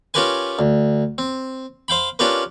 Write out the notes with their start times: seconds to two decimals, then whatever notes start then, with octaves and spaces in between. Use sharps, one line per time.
0.14 C#4 F4 G4 A#4 B4 G#5
0.59 D2
1.18 C4
1.88 C5 F5 G5 B5
2.19 C#4 D4 F4 G4 A#4 B4